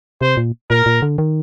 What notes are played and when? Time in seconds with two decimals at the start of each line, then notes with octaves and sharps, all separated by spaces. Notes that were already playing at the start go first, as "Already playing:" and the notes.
0.21 C3 C5
0.37 A#2
0.70 A#2 A#4
0.86 A#2
1.02 D3
1.18 D#3